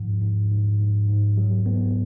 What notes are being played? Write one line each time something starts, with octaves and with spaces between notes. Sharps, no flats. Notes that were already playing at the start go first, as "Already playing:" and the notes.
Already playing: G#2 F3
G#2
G#2
G#2
G#2
F#3
B3